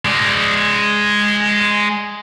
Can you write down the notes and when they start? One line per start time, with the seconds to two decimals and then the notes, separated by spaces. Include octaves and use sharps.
0.05 G#3 D5